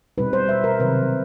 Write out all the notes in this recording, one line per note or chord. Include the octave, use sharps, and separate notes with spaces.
B2 G3 C4 D#4 B4
C5
E5
A#4
C3 D#3 F#3 B4